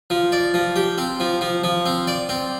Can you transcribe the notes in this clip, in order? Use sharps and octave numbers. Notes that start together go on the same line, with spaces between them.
F3
D5
F3
G4
C4
F3
F3
F3
C4
D5
C4